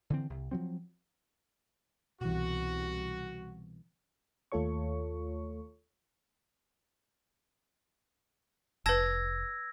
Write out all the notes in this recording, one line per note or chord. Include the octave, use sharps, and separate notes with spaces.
D3 E3 C4
C2
F3 F#3 C4
C2 B2 E3 F#4
D#2 A3 F4 A4 C#5 C#6
F1 B4 A5 E6 G#6 A#6